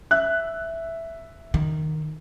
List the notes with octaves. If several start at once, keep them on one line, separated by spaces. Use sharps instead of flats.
E5 F#6
D#3